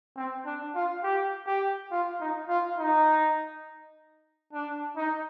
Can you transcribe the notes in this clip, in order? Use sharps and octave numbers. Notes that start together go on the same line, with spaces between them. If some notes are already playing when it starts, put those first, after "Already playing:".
C4
D4
F4
G4
G4
F4
D#4
F4
D#4
D4
D#4